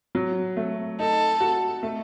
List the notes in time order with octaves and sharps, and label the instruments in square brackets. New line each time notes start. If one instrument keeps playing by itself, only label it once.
[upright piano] F#3
A3
[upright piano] D#4 [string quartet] A4
[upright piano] F#4
A3